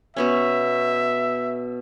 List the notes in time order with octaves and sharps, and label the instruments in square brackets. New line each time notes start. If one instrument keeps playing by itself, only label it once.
[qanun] B2 B3 C#4 [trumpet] E5